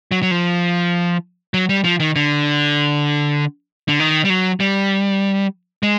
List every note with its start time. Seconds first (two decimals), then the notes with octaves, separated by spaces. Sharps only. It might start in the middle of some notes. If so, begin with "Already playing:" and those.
0.12 F#3
0.23 F#3
0.31 F3
1.54 F#3
1.69 G3
1.84 F3
2.00 D#3
2.16 D3
3.88 D3
4.00 D#3
4.25 G3
4.30 F#3
4.60 G3
5.83 G#3